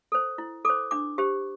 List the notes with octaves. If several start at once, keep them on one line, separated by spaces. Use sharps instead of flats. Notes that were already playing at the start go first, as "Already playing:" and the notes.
A4 C5
E4
A4 C5 D6
D4 D6
G4 C5